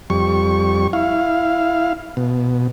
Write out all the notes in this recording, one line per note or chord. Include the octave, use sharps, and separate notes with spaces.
F2 G3 C#6
E4 F5
B2